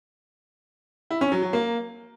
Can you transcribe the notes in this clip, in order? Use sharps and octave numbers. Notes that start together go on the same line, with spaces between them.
E4
C#4
F#3
F#3
A#3